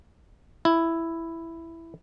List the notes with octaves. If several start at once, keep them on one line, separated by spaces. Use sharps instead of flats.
E4